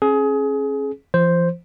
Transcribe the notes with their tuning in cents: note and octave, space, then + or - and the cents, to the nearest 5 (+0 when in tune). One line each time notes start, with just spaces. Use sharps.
C#4 -35 G#4 +25
F3 -40 C5 +0